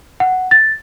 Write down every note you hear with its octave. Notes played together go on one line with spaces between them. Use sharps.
F#5
A6